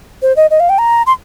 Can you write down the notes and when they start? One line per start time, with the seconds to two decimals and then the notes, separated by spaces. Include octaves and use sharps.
0.22 C5
0.36 D#5
0.50 D#5
0.60 F5
0.69 G5
0.78 A#5
1.06 C6